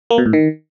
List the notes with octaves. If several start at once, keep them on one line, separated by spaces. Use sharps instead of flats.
A#3
B2
A2
D#3